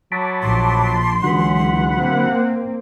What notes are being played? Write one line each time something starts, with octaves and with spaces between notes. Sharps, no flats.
F#3 A5 B5 D6
A#1 C6
C#2 D3 E3 F#3 F#5 B5
A#3 C4